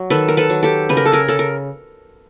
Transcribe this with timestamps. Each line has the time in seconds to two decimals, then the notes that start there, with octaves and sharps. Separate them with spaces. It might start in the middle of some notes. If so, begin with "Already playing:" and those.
Already playing: F#3
0.10 D#3 A4 B4
0.28 A#4
0.37 A4 B4
0.50 F#3
0.63 G4 A4
0.89 C#3 B4
0.97 A#4
1.06 A4
1.12 G#4 A#4
1.28 C#3 A4
1.39 A#4